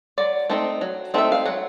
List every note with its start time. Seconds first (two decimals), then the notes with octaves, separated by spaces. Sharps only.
0.18 F#3 D5
0.50 A3 C4 D#4
0.81 F#3
1.14 A3 C4 D#4 E5
1.32 F5
1.46 F#3 F#5